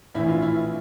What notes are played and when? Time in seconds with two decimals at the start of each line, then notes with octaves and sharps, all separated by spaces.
0.15 A#1 A2 E3 E4
0.28 F4
0.42 E4